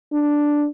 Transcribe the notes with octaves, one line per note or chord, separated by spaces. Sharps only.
D4